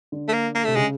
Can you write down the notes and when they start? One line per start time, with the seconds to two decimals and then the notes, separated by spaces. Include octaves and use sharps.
0.12 D3
0.28 A3
0.33 A#3
0.55 A#3
0.64 C3 A3
0.76 C#3 G#3